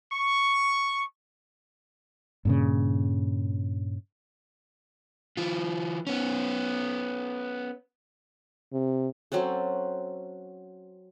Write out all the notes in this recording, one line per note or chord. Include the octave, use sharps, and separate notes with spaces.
C#6
G2 A#2 C#3
E3 F4
B3 C#4
C3
F#3 C4 C#4 A4